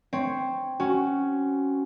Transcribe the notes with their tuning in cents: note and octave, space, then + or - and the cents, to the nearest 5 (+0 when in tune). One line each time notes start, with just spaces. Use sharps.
C4 +0 C#5 +0
C#4 +0 F#4 +15